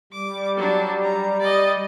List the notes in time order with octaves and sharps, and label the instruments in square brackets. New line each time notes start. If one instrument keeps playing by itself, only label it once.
[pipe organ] G3 [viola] D6
[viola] F#3 D4
A#5
D5 D#5